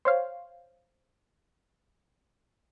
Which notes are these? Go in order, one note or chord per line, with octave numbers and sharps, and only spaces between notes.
C5 C#5 F5